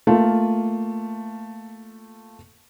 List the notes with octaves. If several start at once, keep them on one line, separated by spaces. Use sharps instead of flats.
A3 A#3 F4